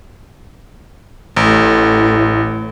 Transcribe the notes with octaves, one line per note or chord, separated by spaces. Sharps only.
A1 A2